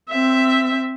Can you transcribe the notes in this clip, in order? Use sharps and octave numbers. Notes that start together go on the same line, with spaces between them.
C4 E5